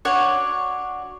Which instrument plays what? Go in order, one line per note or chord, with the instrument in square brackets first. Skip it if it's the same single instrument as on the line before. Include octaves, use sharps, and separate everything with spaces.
[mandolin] D4 F#4 C#5